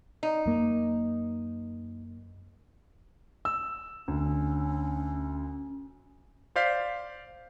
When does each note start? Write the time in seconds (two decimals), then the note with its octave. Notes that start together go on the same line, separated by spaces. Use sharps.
0.23 D#4
0.46 F#2 A#3
3.45 E6
4.08 D2 C#4
6.56 C5 D5 F5 G6 B6 C7